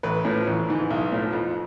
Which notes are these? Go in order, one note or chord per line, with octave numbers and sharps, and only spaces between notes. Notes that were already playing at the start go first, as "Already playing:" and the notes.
A1 B4
A2 F3
A1
G#2 E3
B1
A2 F3
F2